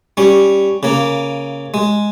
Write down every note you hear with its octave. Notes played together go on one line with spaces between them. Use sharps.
G3 C#4
C#3 A#3
G#3